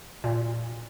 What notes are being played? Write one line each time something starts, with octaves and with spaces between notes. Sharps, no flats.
A#2